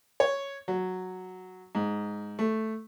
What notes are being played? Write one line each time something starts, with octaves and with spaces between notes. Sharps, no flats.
C#5
F#3
G#2
A3